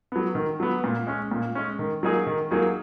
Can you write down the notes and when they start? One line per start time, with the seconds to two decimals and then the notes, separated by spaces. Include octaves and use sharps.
0.12 F#3 B3
0.35 D#3
0.60 F#3 B3
0.84 A#2
1.07 G#3 C#4
1.31 A#2
1.55 G#3 C#4
1.79 D#3
2.03 F#3 A#3 D#4 G#4
2.27 D#3
2.51 F#3 A#3 D#4 G#4